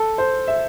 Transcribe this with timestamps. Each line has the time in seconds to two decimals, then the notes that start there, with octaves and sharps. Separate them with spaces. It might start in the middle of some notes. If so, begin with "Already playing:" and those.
Already playing: A4
0.18 C5
0.48 E5